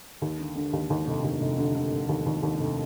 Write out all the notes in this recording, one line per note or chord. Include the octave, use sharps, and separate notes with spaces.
D#2
D3
D3
D#2
D#2
F1
D#2
F1
D3
D3
F1
D#2
D#2
D#2
F1